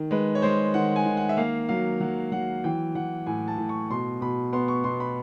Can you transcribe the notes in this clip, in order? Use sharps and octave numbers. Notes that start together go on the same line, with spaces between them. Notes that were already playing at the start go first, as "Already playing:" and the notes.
Already playing: D#3
G#3 B4
C#5
G#3 C5
D#3 F#5
G#5
D#3
F#5
E5
A#3 F5
F#3 F5
F#3 F#5
F#3 F#5
E3 G5
E3 F#5
A2 G#5
A5
A2
C#6
B2 C6
B2 B5
B3 C6
C#6
B2 C6
B5